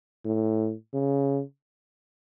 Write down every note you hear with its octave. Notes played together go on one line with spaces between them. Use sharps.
A2
C#3